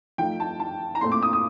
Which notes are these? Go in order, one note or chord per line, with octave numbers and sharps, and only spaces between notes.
F3 A3 D#4 G5
A5
A5
A#5
A#2 A3 C4 C6
D6
D#6
D#6